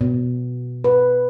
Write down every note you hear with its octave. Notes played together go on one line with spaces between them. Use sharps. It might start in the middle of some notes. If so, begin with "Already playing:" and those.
B2
B4